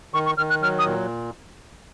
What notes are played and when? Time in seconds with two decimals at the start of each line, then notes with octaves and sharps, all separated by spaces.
0.14 D#3 C#6
0.26 C#6
0.37 D#3 F6
0.50 F#6
0.62 F#3 F6
0.79 D#6
0.86 A#2